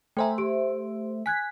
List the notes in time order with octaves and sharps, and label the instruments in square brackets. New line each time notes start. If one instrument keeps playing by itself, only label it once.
[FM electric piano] A3 C5 E5 [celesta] G5 G#5 A#5
[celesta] G4 D7
[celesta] G#5 F#6 G#6 [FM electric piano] B6